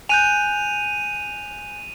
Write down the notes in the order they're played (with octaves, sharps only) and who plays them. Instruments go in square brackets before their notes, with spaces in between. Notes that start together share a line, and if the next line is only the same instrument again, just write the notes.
[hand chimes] G#5 F#6 G6 [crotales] D#7 F7